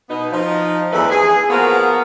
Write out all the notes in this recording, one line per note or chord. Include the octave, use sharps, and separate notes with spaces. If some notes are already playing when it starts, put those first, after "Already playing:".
B2 B3 D#4
F3 D#4
E2 G2 E3 A3 G#4 B4
G#4
F3 A#3 B3 F#4 A#4